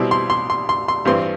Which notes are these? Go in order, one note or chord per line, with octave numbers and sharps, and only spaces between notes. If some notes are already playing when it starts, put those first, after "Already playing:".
Already playing: B2 G3 C4 E4
C6
C6
C6
C6
C6
G2 E3 G3 C4 C6